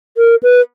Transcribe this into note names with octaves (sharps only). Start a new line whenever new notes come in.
A#4
B4